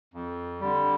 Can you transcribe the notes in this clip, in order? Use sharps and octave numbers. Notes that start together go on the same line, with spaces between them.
F2
D3 G3